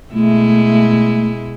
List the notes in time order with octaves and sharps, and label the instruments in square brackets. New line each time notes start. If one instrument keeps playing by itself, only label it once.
[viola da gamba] B2 G#3 E4 [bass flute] A3